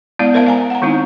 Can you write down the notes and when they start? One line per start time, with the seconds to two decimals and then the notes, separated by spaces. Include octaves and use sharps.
0.19 G#3 B3 E4 D5 F5
0.34 A#4 C5 E5 F5 A5
0.47 F5 G#5 A#5
0.70 F#5 A#5
0.82 D#3 G#3 C4 D#4 E4